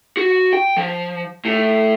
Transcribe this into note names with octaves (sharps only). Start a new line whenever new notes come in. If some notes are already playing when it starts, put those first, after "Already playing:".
F#4
G5
F3
A2